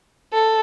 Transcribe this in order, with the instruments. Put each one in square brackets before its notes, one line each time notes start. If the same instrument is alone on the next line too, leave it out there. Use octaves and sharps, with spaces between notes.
[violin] A4